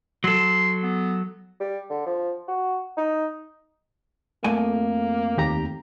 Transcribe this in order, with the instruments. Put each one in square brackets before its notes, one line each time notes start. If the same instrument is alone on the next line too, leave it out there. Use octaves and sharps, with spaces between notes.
[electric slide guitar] F#3 A4 [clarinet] C6
[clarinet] B3
[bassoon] G3
D3
F3
F#4
D#4
[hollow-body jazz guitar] F2 A3 G#5 [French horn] A#3
[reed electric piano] D#2 G4 A#5